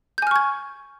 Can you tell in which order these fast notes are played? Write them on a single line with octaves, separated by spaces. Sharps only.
G6 G#5 F6 C#6 G#6